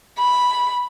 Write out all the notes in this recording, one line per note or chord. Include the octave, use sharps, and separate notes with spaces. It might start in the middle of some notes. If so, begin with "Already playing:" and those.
B5